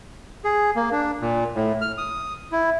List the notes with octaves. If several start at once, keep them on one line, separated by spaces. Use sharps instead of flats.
G#4
A#3
D4
A#2
A2
F6
D#6
E4